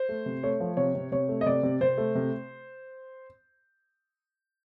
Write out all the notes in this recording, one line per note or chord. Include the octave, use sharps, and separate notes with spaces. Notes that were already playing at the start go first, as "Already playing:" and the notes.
Already playing: C5
A3
C3
A3 C#5
F3
C3 C#5
C3
C3 C#5
A3
D#5
C3 D5
C3
C3 C5
A3
C3